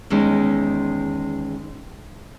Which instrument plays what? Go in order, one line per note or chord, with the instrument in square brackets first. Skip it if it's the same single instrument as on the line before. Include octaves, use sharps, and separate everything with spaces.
[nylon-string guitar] E2 D#3 G#3 C#4